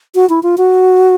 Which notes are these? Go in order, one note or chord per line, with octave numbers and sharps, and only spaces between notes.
F#4
E4
F4
F#4